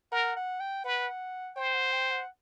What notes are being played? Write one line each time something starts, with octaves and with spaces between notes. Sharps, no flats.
A#4 F#5
F#5
G5
B4 F#5
C5 G5
F#5
G5
F#5